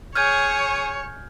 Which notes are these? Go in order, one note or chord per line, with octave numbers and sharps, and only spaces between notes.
G#4 C#5 F6 G6 G#6